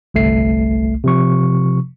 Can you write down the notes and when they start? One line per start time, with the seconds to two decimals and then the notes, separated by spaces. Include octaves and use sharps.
0.14 G1 C2 A3 C7
1.04 C3 F3 C#6